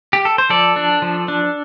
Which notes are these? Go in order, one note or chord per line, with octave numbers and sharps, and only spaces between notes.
G4
A4
C5
F3 A4 D5
D4
F3
D4